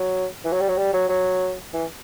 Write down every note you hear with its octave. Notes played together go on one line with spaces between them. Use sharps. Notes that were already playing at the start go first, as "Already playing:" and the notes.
Already playing: F#3
E3
F#3
G3
F#3
G3
F#3
F#3
E3